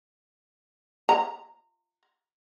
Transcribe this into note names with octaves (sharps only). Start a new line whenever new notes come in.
A#5